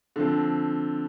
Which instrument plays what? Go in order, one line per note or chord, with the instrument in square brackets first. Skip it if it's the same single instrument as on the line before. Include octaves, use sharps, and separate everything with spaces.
[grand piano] D3 F3 C4